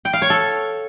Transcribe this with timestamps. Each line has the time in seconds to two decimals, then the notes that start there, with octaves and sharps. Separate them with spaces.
0.05 G5
0.13 F5
0.22 C#5
0.30 A4